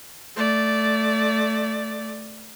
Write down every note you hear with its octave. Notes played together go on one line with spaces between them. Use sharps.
A3 D5